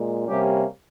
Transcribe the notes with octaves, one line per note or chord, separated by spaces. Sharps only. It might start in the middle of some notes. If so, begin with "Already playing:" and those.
Already playing: A#2 G#3
C3 G3 A#3 C#4 G4